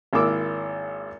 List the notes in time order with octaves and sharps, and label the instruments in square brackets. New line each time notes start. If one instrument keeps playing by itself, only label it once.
[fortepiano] G#1 A#3 E4 D6 E6